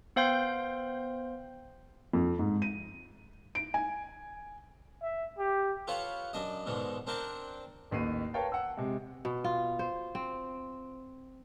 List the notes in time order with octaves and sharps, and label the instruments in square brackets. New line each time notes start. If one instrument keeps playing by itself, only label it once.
[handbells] B3 C5 F5 G5 C6 G6
[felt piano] F2
G#2
D#7
D7
G#5
[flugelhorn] E5
G4
[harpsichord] F4 A4 B4 C#5 F5 F#5
F#2 D4 D#5
G#2 B2 D3 D#3
C4 D4 A#4 C5 D5 F#5
[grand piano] A1 D#2 C7 D#7
A#4 B4 C#5 F5 G5 A5
F#5 E6
C3 G#3
[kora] B2
F4
C5
C4